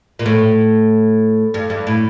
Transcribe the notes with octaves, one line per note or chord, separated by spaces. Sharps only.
A#2
A2
G2
G2
A2